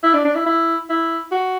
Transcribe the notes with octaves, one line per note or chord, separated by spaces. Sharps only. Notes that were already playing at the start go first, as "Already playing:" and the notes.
E4
D4
D4
E4
E4
E4
F#4